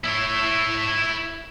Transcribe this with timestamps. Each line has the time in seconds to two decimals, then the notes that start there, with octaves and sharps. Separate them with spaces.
0.05 E4 C#5